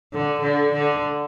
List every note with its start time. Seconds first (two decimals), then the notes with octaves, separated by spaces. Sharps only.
0.13 D3
0.42 D3
0.73 D3